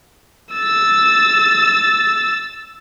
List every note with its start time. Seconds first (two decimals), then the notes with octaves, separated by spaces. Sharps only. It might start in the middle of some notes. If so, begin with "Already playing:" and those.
0.53 E6 A6